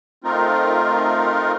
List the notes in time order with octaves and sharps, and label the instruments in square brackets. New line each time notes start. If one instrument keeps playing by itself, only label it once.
[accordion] A3 C4 D#4 F4 A#4